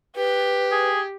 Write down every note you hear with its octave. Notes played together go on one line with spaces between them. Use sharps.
G4 B4
G#4